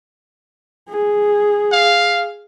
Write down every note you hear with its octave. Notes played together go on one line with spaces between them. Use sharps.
G#4
F5